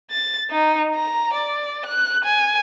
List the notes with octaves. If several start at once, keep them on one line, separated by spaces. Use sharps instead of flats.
A6
D#4
A#5
D5
F#6
G#5